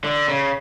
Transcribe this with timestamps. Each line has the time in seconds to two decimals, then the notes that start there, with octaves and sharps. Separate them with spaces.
0.04 D3
0.28 C#3